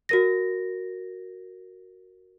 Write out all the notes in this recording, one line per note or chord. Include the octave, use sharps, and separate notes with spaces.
F#4 A#4 A#6